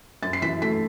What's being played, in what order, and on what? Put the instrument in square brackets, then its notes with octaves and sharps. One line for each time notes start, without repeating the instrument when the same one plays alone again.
[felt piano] F#2 A6
C7
E3 B6
A3 B6